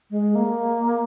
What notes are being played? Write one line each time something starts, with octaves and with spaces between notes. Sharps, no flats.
G#3
A#3